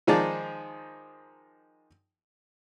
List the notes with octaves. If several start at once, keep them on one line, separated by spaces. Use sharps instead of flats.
D#3 F3 G#3 D#4 D5 A5